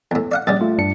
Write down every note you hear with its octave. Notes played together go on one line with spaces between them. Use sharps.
E2 A2
D5 F5 F#5
A#1 C#3 G3 D5 A6
A3 F4
G2 D4 C#7